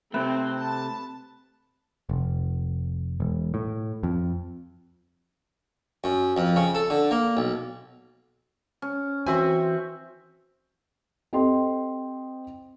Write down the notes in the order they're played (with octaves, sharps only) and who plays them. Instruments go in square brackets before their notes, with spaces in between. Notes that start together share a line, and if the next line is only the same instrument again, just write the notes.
[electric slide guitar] C3 A3 [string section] C4 [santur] B4
[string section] A5
[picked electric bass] F1
E1
A2
F2
[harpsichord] F#2
F2
C#3
A4
D3
A#3
B1
[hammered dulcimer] C#4
[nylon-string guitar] E3 F#4 G#5 [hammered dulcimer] C4 E5 C#6
[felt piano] C4 G4 A4 D#5 G5 C6